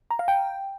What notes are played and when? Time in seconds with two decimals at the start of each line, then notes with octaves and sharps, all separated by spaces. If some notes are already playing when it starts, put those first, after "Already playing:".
0.11 A#5
0.19 F5
0.28 G5